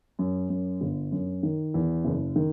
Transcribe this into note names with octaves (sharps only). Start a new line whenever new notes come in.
F#2
F#2
G1
F#2
D#3
E2
F#1
D#3